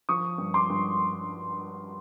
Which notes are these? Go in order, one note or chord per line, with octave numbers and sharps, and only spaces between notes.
F3 C#6 D#6
G2
C6 D6
G2